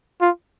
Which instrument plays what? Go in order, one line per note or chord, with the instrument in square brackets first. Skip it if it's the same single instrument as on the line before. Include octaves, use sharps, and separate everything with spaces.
[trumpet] F4